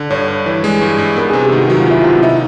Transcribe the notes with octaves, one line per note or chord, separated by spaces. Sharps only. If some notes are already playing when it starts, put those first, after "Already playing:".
Already playing: D3
G2 C#5
G2
E3
G#3
G2
G2
B3 A#4
G#4
C3
G4
D#3 F#4
F#3 F#4
F4
B3 E4
F4
C3
D#4 E4